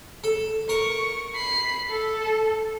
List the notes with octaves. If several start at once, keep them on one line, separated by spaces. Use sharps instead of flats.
A4
A#4 C#6
B5 C7
A4